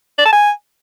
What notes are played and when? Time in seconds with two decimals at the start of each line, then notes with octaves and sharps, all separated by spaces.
0.19 D5
0.26 A5
0.33 G#5